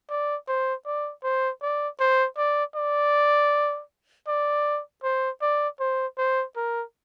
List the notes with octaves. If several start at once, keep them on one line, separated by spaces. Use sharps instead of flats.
D5
C5
D5
C5
D5
C5
D5
D5
D5
C5
D5
C5
C5
A#4